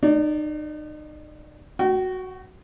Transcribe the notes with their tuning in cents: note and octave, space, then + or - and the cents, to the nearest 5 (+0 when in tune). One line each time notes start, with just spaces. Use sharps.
D#4 -40 D5 -15
F#4 +0 G5 -40